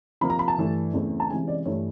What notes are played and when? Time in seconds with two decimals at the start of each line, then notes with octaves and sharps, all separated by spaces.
0.21 C3 F3 A#3 B5
0.30 A#5
0.39 B5
0.48 A5
0.58 G2 E3 A3
0.93 E2 C#3 E3 A3 C4
1.20 A5
1.30 C3 E3 G#3 C#4 G#5
1.48 D5
1.65 G2 E3 A3 C#5